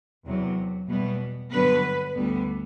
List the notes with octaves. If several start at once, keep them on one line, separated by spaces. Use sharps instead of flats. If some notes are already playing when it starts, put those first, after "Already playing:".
E2 C3 F#3
E2 B2 G3 B3
G2 D3 F#3 B3 B4
D2 D3 G3 B3